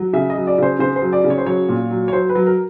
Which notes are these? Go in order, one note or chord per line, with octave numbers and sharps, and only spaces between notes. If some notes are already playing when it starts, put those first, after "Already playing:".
Already playing: F#3
C#3 E5
D#5
F#3
D5
C#3 C5
C#3 C5
C5
F#3
D5
C#3
C#5
C5
F#3 C#5
A#2
F#3
C#5
F#3 C5
B4
F#3
A#4